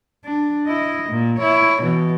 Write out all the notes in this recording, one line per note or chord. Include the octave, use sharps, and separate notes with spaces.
D4
E4 D#5
A#2
E4 C#5
B2 E3